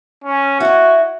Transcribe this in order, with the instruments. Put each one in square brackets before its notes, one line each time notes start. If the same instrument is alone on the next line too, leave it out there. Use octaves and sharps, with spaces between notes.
[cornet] C#4
[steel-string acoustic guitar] E4 D#5 [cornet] F#4